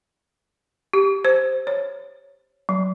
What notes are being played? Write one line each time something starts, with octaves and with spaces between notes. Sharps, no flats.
G4
C5
C#5
F#3